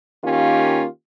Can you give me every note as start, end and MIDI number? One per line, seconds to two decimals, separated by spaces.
0.25 0.86 51
0.25 0.86 58
0.25 0.86 61
0.25 0.86 65
0.25 0.86 67